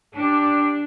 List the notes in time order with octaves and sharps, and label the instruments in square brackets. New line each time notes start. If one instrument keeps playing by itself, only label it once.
[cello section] D4 [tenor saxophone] G4